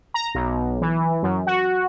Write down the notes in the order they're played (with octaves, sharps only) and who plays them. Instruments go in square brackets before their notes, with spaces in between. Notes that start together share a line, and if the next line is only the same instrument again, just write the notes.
[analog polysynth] A#5
B1
E3
F#2
F#4